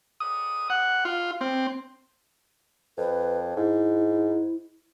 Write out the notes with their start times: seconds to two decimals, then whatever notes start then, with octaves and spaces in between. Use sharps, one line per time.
0.20 D#6
0.70 F#5
1.05 F4
1.41 C4
2.97 F2 B4
3.56 G#2 E4